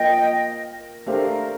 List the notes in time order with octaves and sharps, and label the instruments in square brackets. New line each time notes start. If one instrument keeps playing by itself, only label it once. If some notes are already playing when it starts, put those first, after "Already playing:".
Already playing: [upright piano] F3 A#3 F4 A#4 [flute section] D#5 G5
[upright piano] A3 D4 G4 C5 F5 [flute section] A#4